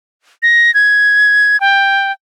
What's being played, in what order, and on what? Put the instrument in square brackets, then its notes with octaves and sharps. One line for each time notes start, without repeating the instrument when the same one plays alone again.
[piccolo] A#6
G#6
G5